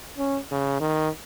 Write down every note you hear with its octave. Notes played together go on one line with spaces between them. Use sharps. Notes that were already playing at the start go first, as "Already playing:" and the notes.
C#4
C#3
D#3